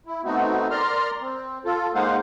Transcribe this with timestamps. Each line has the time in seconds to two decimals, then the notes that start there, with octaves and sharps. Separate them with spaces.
0.06 E4
0.25 A3 B3 C4 D#4 F#4
0.71 A#4 D5 A#5 C6 F6
1.21 C4
1.65 F4 A4
1.95 G#3 A#3 D#4 C5 F5 F#5